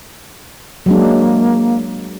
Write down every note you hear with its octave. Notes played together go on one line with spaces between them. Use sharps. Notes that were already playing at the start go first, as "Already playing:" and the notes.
F#3 G#3 A#3 D4